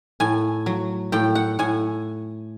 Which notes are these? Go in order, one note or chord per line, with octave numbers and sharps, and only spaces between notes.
A2 G#5
F#3
A2 G5
F#5
A2 G#5